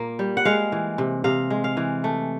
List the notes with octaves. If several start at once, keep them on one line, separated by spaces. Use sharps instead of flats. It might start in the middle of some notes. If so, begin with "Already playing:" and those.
Already playing: A#2 A#3
G3
F#5
G#3 F5
E3
C3
C3 F5
G#3
F5
E3
A3